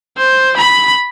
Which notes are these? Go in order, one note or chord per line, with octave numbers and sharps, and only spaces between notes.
C5
B5